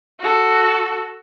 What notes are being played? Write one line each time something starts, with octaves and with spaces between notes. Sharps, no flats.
F#4 A4